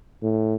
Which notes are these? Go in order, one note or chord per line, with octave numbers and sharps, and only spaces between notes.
A2